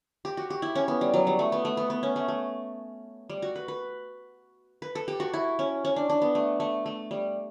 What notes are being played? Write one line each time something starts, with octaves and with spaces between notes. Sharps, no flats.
G4
F#4
G4
E4
C#4
B3
G3
F#3
G3
A3
B3
A3
B3
B3
C#4
A3
A3
G3
F#4
B4
B4
B4
A4
G4
F#4
E4
C#4
C#4
D4
D4
B3
A3
A3
A3
G3